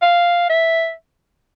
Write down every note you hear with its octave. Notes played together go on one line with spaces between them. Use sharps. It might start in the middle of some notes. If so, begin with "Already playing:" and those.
F5
E5